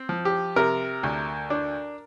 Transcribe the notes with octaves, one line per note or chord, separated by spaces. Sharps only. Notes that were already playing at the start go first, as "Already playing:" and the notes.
Already playing: C4
F3
G4
C3 A#4
D2
D4